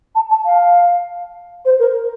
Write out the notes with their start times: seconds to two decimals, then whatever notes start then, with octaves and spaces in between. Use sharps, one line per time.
0.15 A5
0.29 A5
0.45 F5
1.65 C5
1.79 A#4